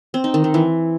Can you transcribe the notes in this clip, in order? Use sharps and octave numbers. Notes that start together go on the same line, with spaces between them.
C4
D#4
D#3
D#3
E3